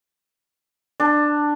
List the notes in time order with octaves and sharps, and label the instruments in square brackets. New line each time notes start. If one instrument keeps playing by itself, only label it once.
[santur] D4